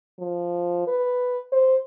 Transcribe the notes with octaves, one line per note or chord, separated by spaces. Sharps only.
F3
B4
C5